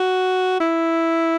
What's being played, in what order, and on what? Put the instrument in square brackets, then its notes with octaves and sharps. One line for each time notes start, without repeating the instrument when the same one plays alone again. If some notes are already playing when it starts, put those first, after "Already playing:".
Already playing: [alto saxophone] F#4
E4